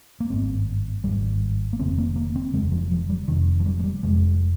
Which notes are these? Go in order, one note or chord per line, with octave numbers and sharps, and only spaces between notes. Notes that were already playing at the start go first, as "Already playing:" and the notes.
A#3
G#1 G2 C4
G#1 G2 G3
A#3
F1 D#2 C#3 C4
A#3
A#3
C4
F1 D#2 C#3 G#3
F3
F3
G3
F1 F2 C3 D#3
F3
G3
G#3
G3
F1 F2 C3 G#3